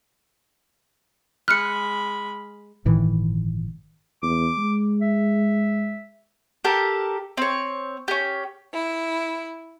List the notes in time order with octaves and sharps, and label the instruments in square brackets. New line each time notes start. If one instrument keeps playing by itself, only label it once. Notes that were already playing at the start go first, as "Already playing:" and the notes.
[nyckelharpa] G#3 B5 [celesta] F6 [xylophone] F#6 C#7
[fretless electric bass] G1 A2 D#3 E3
[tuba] E2 [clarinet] D6
[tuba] G#3
[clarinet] E5
[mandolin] G4 A4 A#4 A5
C4 C#5
C#4 G4
[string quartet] E4